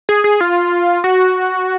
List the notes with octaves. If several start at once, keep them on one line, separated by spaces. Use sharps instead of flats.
G#4
G#4
F4
F#4